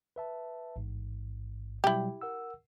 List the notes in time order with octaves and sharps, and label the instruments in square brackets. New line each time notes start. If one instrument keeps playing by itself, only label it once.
[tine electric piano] B4 E5 A5
A1 G#2
[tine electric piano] B2 F#3 G3 [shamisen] E4 G4
[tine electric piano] A#4 F#5 E6